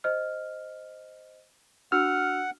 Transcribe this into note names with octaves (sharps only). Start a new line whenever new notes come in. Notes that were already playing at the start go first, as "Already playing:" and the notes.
C5 D#5 F6
D4 F#4 F#5 E6 F6